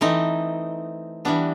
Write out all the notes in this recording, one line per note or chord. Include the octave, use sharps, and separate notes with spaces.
E3 A3 C4 D#4
E3 G3 B3 D4